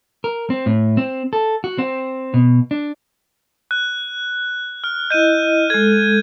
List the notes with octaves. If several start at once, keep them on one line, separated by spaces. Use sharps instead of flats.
A#4
C4
A2
C4
A4
F#4
C4
B2
D4
F#6
F6
E4 D#5 G6 D#7
G#3 A4 G#6